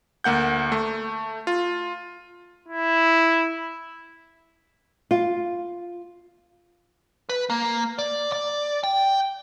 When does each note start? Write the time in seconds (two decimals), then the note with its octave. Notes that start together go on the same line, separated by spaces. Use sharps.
0.24 D2 A#3 F#5 G6
0.72 A3
1.47 F4
2.68 E4
5.11 F4
7.29 B4
7.50 A#3
7.99 D5
8.32 D5
8.83 G5